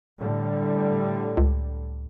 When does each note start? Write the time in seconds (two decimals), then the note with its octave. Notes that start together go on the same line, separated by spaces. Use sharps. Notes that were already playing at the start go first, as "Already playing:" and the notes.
0.19 A2 D3 G3
1.37 C#2